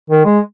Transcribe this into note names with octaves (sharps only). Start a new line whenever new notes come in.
D#3
G#3